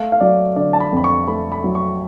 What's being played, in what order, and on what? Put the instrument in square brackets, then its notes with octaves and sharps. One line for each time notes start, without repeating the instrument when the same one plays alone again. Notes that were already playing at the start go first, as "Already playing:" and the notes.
Already playing: [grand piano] A3 F5
F5
F#3 D5
D3 D5
A5
B5
F2 B5
C#6
A3 B5
B5
F#3
C#6